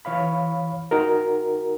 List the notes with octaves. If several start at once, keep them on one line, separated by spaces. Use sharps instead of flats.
E3 C#5 F5 B5
D#4 F#4 A#4